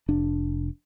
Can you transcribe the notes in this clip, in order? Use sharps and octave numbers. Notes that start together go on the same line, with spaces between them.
F1 D4